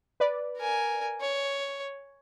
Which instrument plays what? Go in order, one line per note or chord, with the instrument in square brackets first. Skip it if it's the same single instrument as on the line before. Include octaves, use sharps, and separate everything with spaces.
[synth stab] B4 D5
[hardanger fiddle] A#4 G#5
C#5